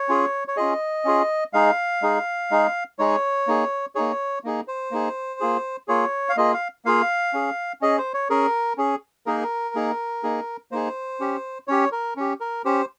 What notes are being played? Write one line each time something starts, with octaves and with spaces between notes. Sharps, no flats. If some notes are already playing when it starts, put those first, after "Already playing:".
Already playing: C#5
C#4 F4 G#4
C#5
C#4 F4 G#4 D#5
C#4 F4 G#4
G#3 D#4 G#4 F5
G#3 D#4 G#4
G#3 D#4 G#4
G#3 D#4 G#4 C#5
A#3 D#4 G#4
A#3 D#4 G#4 C#5
A#3 D#4 G#4
C5
A#3 D#4 G#4
A#3 F4 G#4
A#3 F4 G#4 C#5
F5
A#3 F4 G#4 D#5
F5
A#3 F4 G#4 F5
C#4 G#4
C#4 G#4 D#5
C5
C#5
C#4 G#4 A#4
C#4 G#4
A#3 D#4 G#4 A#4
A#3 D#4 G#4
A#3 D#4 G#4
A#3 D#4 G#4 C5
C#4 G4
C#4 G4 C#5
A#4
C#4 G4
A#4
C#4 G4 C5